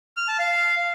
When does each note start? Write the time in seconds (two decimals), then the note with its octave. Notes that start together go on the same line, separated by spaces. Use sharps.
0.17 F6
0.28 A5
0.39 F5